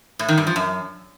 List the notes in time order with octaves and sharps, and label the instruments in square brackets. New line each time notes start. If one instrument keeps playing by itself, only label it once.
[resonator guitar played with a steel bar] A2
D#3
G2
F3
F#2